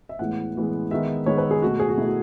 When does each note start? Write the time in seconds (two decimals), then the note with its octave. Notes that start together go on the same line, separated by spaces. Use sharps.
0.09 E5
0.19 A2 E3 G#3 B3 F#5
0.55 A2 E3 G#3 B3
0.91 D#3 G#3 B3 E5
1.26 D#3 G#3 B3 C#5
1.38 B4
1.51 G#4
1.62 B2 A3 F#4
1.80 G#4
1.89 F#4
1.97 B2 A3 E4
2.06 F#4